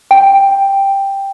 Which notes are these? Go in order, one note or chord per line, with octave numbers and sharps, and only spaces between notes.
G5